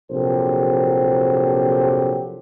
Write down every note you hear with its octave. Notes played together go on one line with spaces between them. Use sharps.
A#1 C3 F#3 G4 A4 C5